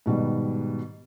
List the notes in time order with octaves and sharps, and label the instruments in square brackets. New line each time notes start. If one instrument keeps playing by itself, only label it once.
[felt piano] G#2 B2 D#3 G3